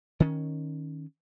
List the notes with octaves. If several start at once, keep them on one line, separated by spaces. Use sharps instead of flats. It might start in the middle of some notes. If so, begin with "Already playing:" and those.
D#3 C#4